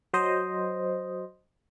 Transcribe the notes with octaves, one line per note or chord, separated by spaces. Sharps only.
F#3 C5 D#5